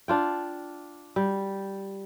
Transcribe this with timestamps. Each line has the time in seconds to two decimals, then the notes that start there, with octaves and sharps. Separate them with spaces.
0.08 D4 F4 G5
1.16 G3